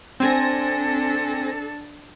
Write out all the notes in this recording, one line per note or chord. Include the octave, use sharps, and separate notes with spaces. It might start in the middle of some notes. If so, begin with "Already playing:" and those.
C4 D4 A4 G#5 A#6